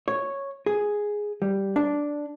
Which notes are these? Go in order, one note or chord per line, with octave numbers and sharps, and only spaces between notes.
C#5
G#4
G3
D4